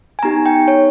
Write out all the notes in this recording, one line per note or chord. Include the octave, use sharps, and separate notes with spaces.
G#5
B3 D#4 G4 A#5
G5
C#5